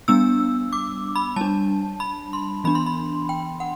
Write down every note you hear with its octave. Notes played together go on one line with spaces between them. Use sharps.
G3 B3 D4 E6
D6
B5
G3 D4 A5
B5
C6
E3 B3 D4 B5
C6
B5
G5
F#5